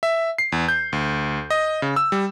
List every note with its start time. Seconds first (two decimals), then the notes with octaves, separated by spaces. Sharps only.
0.03 E5
0.38 C7
0.52 E2
0.68 G6
0.93 D2
1.50 D#5
1.82 C#3
1.96 E6
2.12 G3